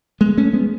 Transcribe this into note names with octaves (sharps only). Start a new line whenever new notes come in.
G#3 B3
A3 C#4
G#3 B3